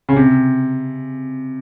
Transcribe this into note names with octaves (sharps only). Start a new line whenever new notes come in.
C#3
C3